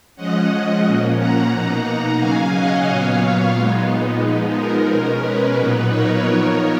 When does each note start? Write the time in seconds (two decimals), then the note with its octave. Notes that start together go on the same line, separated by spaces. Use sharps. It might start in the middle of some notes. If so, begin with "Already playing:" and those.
0.16 F3 G#3 C#4 D#5 F#5
0.84 A#2 F3 A#3 C#4
1.17 F#5 A#5
1.51 B2 A#3 D#4 F#5 A#5
2.18 C#3 F#3 C#4 F5 G#5
2.53 D#5 F#5
2.86 A#2 F#3 B3 C#5 F5
3.53 A#2 G#3 B3 D#4
4.21 F3 G#3 B3 D#4
4.55 A#4
4.89 B2 G#3 C#4
5.23 B4
5.56 A#2 F#3 B3 D#4
5.89 A#4 C#5
6.24 F3 B3 D#4